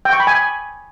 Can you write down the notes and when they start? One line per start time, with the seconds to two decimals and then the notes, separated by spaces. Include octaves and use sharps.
0.05 G5
0.13 C#6
0.20 B5
0.27 G#5